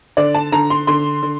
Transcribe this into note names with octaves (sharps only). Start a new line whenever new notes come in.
D3 D5
A5
D3 A#5
C6
D3 C6
D3